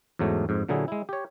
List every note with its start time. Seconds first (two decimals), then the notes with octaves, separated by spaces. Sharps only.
0.19 E2 G#2 F#3 A3
0.49 F2 G#2
0.69 A#2 D3 F#3 E4 G#4
0.88 G#3 E4
1.09 G4 C#5